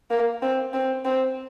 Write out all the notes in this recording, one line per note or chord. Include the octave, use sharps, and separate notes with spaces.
A#3
C4
C4
C4